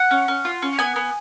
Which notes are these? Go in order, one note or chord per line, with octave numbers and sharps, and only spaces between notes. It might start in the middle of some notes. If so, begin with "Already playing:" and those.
Already playing: F#5
C#4
C#4
F4
C#4
B3 G#5
B3